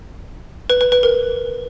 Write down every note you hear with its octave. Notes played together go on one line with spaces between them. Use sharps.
B4
B4
B4
A#4